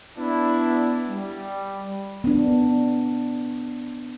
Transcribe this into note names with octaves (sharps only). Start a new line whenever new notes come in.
B3 D4 E4
G3
B3 D4